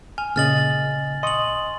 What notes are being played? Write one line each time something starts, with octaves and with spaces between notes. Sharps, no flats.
G#5 F6
A#2 C#3 D#5 F6 A6 F#7
D#5 C6 C#6 D#6 F#7